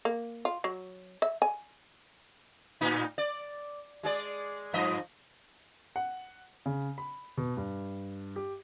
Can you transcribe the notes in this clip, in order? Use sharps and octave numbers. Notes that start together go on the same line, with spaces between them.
A#3
F4
F#3
E5
G#5
A2 D#4
D5
G#3 G#4 D5
G2 F3 D#5
F#5
C#3
B5
B2
G2
G4